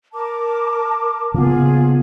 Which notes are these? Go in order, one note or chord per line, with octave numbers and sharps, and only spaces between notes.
A#4 A5 D6
C#3 A#3 B3 F4 G#4